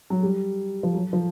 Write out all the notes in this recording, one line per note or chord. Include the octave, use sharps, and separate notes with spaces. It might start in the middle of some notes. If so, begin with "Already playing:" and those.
F#3
G3
F3
F#3
F3